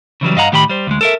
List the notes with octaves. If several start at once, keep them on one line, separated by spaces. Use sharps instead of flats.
C#3 E3 F#3 G3
G2 D#5 F5 F#5 A#5
A2 D#3 G4 A5 B5
G3 C5
D2 G#3
A4 A#4 E5